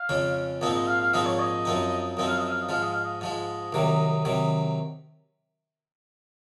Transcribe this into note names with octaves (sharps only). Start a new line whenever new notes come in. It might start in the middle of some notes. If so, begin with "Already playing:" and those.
Already playing: F5
F2 C#3 G#3 C#4
A#1 G#2 F3 C4 D#4 D#5
D#5
F5
F5
A#1 G#2 F3 C4 D#4 D#5
C#5
D#5
F#2 F3 C4 D#4
F#2 F3 C4 D#4 D#5
F5
D#5
F5
D#5
G#2 F3 G#3 F5
D#5
F5
D#5
G#2 F3 G#3 D#5
C2 C3 D#3 F#3
C3 D#3 F#3